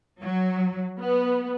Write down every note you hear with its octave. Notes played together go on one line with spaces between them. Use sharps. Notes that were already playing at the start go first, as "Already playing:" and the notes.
F#3
B3